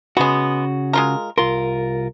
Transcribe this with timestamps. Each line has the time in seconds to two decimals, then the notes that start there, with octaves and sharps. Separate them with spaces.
0.17 C#3 G#3 B3 F#4
0.93 G#3 F4 A#4
1.38 C2 F4 A#4 C6